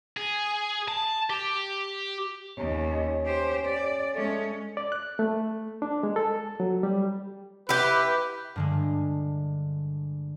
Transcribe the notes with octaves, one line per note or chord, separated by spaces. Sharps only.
G#4
A5
G4
D#2 C#4
G4 C5
D5
G#3 A3 C#4
D5
F#6
A3
D4
G#3
A4
F#3
G3
E4 G4 B4
G2 D3 G#3